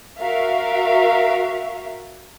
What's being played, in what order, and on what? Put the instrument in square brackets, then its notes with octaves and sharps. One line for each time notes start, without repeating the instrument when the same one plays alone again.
[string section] F#4 A#4 E5 F5